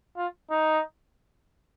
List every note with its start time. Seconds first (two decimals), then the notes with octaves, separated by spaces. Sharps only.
0.17 F4
0.51 D#4